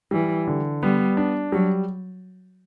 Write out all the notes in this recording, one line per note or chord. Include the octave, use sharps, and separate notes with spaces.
E3 G3
D3
G3 B3
D4
F#3 G3